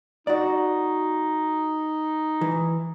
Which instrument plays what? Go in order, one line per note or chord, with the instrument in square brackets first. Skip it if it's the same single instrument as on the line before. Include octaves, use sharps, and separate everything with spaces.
[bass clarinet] D#4 [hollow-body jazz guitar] F#4 D5
[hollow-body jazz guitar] E3